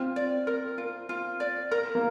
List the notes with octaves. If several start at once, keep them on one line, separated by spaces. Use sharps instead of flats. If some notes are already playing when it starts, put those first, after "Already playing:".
Already playing: C4 F4
D5
A#4
F4
F4
D5
A#4
A#3